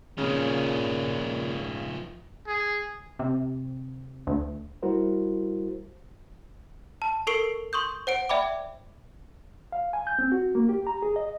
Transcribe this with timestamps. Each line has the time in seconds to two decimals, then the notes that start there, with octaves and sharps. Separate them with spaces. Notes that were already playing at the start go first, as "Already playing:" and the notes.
0.18 A#2 C#3 F3 D#4
2.47 G#4
3.19 C3
4.27 D2
4.83 G3 E4 F#4 A#4 C5
7.02 A5
7.27 A4 A#4 C#6 C7 D7 G7
7.73 C6 C#6 D#6 G6
8.07 C5 F#5 D7
8.29 D5 E5 G5 B5 D6
9.72 F5
9.93 G#5
10.07 G6
10.19 C4
10.32 F#4
10.55 A#3
10.69 G4
10.87 A#5
11.02 G#4
11.16 D#5